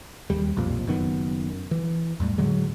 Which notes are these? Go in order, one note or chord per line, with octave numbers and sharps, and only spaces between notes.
D#2 G3
B1 F2 A#2 F3
F#1 F#2 D#3 B3
E3
E2 A2 G3
A2 D3 F#3 G#3